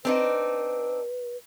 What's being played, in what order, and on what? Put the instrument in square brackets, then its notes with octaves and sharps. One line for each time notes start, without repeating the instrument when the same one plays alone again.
[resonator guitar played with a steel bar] C4 D4 D#4 [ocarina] B4